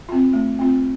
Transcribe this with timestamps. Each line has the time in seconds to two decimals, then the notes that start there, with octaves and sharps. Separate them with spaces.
0.09 C4 F4
0.33 A3
0.59 C4 F4